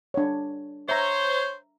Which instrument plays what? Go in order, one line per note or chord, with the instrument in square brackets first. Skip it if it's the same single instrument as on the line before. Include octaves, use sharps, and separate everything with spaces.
[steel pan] D4 C#5
[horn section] C5 C#5 [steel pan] E5 A#5